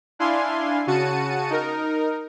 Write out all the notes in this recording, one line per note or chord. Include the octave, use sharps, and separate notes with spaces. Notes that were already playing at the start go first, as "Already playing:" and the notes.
D4 E4 F5 G#5 C6
C#3 F#4 A5 C#7 D#7
D#4 A#4